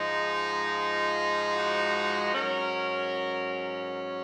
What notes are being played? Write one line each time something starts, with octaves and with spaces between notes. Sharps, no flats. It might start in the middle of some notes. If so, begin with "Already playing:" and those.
Already playing: G#2 F3 G#3 D#4
F4
F#4
G#2 F#3 C#4 A#4